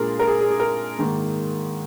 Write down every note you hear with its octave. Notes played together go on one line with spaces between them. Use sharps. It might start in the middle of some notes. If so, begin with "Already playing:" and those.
Already playing: A#2 G#3 D4 F4 G#4 A#4
A#4
G#4
G#4
G#4
A#4
G#2 D#3 A#3